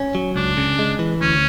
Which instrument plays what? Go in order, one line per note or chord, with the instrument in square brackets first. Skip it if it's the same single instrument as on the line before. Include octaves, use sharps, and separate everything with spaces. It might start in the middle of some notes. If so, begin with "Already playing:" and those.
Already playing: [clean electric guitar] C#4
F#3
[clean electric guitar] C#2 [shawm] D4
[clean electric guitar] C#3
G#3
E3
[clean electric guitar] D2 [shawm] C#4